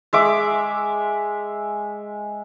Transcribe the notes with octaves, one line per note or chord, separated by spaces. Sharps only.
G#3 E5 D6